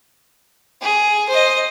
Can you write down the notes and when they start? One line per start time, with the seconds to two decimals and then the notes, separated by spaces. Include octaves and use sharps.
0.82 G#4
1.29 C5 D#5